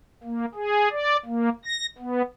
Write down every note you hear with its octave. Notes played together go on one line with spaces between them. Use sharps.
A#3
G#4
D5
A#3
A#6
B3